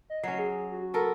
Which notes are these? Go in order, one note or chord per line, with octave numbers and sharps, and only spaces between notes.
D#5
F#3 C#4 C7
G#4
F#4
B3 A4 A#4